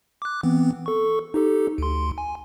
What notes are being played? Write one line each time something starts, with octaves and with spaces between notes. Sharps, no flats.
D6 F#6
E3 B3 C4
A4 C#6
D#4 G4 A4
D2 C6
G#5